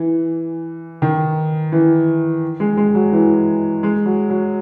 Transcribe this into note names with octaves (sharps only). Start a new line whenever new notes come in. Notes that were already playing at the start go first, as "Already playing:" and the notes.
Already playing: E3
D#3
E3
G#3
G#3
F#3
E3
G#3
F#3
F#3